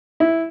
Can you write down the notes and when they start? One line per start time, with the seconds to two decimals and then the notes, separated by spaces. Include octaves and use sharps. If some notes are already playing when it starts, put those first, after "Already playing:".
0.20 E4